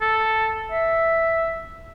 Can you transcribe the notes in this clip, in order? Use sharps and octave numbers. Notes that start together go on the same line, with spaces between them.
A4
E5